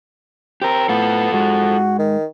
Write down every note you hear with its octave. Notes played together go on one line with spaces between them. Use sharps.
C4 G4 A#4
A2 B3 F4 A4
G#2 G#3 F#4
D#3